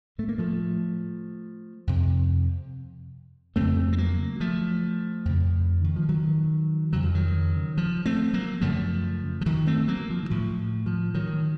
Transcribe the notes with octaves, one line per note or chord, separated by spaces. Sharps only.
A2 A3
A#3
F3 A3
F2 C3
F2 C#3 A3 C4
C4
F#3 A#3
F3 A3
F2 C#3
D#3
F3
D#3 F#3
F2 C#3 F#3
F3
D#3 F#3
F3
A3 C4
F#3 A#3
F#2 C#3 F3 A3
F3
D#3 F#3
A3 C4
F#3 A#3
F3
D#3
A2 F3
F3
D#3 F#3